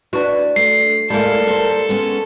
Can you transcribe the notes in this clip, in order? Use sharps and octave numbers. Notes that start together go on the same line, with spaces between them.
D4 F#4 B4
A3 C7
A2 G3 G#3 A#3 E4 A4
A#4 C5
G#3 B3 C#4